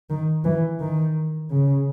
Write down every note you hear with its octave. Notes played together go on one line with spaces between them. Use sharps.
D#3
E3
D#3
C#3